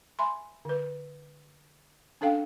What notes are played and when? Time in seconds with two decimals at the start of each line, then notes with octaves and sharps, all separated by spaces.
0.19 E5 G#5 B5 C6
0.65 D3 B4
2.21 C#4 D4 A4 F5 G5